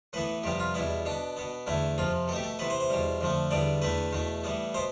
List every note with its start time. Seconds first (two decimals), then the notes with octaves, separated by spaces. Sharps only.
0.13 A2 E3 B3 B4
0.43 F2 C3 G3 B3 G4
0.59 F4
0.74 E2 B2 G3 B3 E4
1.05 B2 B3 D4
1.37 B2 B3
1.67 E2 D3 A3 E4
1.98 F2 C3 F3 F4
2.28 B2 A4
2.32 A3 G4
2.43 A4
2.59 C3 E3 B3 B4
2.70 C5
2.80 C5
2.90 E2 B2 G3
3.21 F2 D3 F3 A3
3.51 E2 D3 G3 B3 D5
3.82 E2 D3 A3 B4
4.13 E2 B2 A3
4.44 A2 E3 G3 B3
4.74 B2 B3 C5